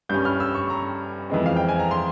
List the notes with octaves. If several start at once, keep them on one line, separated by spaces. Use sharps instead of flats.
G2 G3 C#4 G6
F6
E6
C#6
A#5
F2 E3 G#3 C4
F5
G5
G#5
A#5
C6